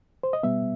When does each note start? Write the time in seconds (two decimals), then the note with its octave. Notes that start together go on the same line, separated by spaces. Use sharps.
0.23 C5
0.33 D#5
0.43 B2 G3 B3 E5